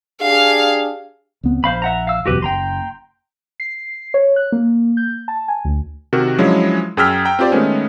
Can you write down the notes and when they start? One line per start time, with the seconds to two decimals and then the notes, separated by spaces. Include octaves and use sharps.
0.21 D4 G4 G#4 F5
1.43 C#2 B3 C4
1.64 A#1 C5 F5 B5
1.82 E5 F#5 A#5
2.07 F5 E6
2.26 F#1 B1 E2 F#4 G4 B4
2.42 F#1 G5 A#5 C6
3.60 C7
4.14 C#5
4.36 F#6
4.52 A#3
4.97 G6
5.28 A5
5.48 G#5
5.65 D2
6.13 C3 D#3 F#4 A#4
6.38 F3 F#3 G#3 C#4 D4 E4
6.97 F#2 G#4 G5 E6 F6 B6
7.25 G5 A#5
7.39 C4 F4 G4 C5 D5
7.52 D#3 G#3 A3 B3 C#4